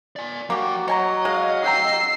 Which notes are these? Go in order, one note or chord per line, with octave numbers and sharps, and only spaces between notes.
D5 G#5
F#3 A#3 F#4 G4 G5
F#3 C#5 D#5 G#5 A#5
G#3 F5
F#4 G5 A#5 E6 C7